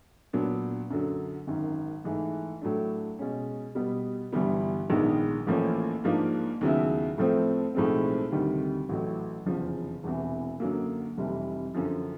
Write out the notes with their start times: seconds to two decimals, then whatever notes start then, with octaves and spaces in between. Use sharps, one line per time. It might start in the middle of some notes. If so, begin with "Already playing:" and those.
0.33 A#2 F#3 B3 D4
0.90 F#2 D3 F#3
1.47 G#1 F#2 D#3
2.04 G#2 E3 A3
2.61 A2 F#3 A3 D4
3.19 B2 G#3 C#4
3.75 B2 G3 B3
4.33 G1 G2 E3 G3 B3
4.90 A#1 G#2 D#3 G#3 B3
5.47 A1 A2 F3 A#3 C#4
6.04 G#2 F3 A#3 D4
6.61 D#2 C#3 F#3 B3 E4
7.18 A2 F3 A3 C4
7.75 B1 A2 F3 G#3 C4
8.32 D2 C3 D#3 G3
8.89 A1 A2 F#3
9.46 F1 E2 C#3 F3
10.03 E1 E2 C3 E3
10.60 F#2 D3 F#3 A#3
11.17 F1 F2 C3 E3 G3
11.74 F#2 D3 F3